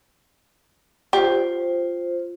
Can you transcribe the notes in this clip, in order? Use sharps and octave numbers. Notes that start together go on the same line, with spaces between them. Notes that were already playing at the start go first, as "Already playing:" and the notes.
F4 G4 C5